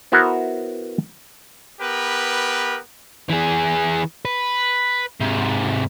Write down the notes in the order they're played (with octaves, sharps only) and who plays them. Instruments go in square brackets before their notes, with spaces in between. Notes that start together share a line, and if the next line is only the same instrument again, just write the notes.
[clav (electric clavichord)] B3 E4 F#4 A#4 C5
[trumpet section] B3 G4 A#4 B4
[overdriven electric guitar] E3 G#4
B4
G#2 C3